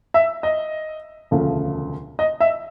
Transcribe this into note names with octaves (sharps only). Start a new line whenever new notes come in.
E5
D#5
E1 D2 C#3 F3 A3
D#5
E5